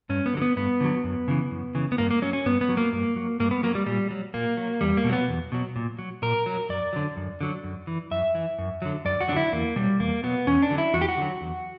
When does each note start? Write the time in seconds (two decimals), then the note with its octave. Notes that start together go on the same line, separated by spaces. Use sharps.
0.09 G2 C#4
0.26 B3
0.34 D3 F#3
0.42 B3
0.56 G2 B3
0.80 D3 F#3
1.04 F#2
1.28 C#3 E3
1.51 F#2
1.75 C#3 E3
1.92 B3
1.98 G2 A#3
2.11 A#3
2.22 F#3 C#4
2.33 C#4
2.46 G2 B3
2.61 B3
2.69 F#3
2.77 A#3
2.93 G2
3.16 F#3
3.40 G2 A#3
3.51 B3
3.63 F#3 A#3
3.75 G3
3.86 A#2 G3
4.11 F#3
4.34 A#2 A#3
4.57 F#3
4.81 E2 G3
4.97 A#3
5.04 B2
5.09 F#3 B3
5.28 E2
5.52 B2 F#3
5.76 A#2
5.99 F#3
6.22 A#2 A#4
6.46 F#3
6.69 F#2 D5
6.93 D3 F#3
7.17 F#2
7.41 D3 F#3
7.64 F#2
7.87 E3
8.11 F#2 E5
8.35 E3
8.59 F#2
8.82 D3 F#3
9.05 F#2 D5
9.21 F#4
9.28 F#3 D4
9.32 D3 E4
9.52 E2 A#3
9.76 B2 F#3 G3
9.99 E2 A#3
10.23 B2 F#3 B3
10.47 E2 C#4
10.62 D4
10.70 D3 F#3
10.78 E4
10.94 E2 F#4
11.01 G4
11.09 F#4
11.18 D3 F#3
11.41 E2